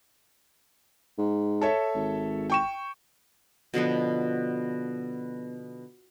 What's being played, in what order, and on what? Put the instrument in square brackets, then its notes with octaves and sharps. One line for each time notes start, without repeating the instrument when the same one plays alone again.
[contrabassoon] G#2
[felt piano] A4 C#5 E5
[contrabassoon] G#1
[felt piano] G5 C#6 E7
[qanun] B2 D3 F3 B3